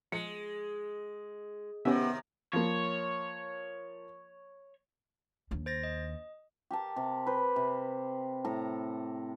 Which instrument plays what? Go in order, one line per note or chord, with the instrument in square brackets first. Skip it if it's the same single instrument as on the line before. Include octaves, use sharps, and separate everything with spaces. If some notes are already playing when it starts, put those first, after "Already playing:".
[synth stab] F3 [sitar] G#3 [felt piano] C#7
[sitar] C3 D#3 [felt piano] B3 [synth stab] C#4 G4 E5
[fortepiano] F3 A#3 [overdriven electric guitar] C#5
[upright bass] D#2 D4
[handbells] C5 A6 A#6
D#5
[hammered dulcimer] G4 A#4 A5
C3
B4 C5
C3
A2 A4 A#5